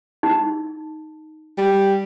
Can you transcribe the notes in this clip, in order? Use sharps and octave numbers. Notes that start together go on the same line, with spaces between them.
D#4
G3